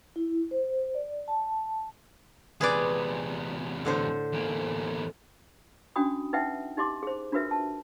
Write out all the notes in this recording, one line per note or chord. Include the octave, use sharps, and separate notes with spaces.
E4
C5
D5
A5
E2 C3 G#4 B4 D5
A2 D3 C5
E2 A#3
C#4 D4 F#4 G5 B5 D#6
D#4 B4 E5 F#5 G5
D#4 G4 D#5 C6 D6
G#4 C5
D4 F4 F#4 A#4 B4 E5
A5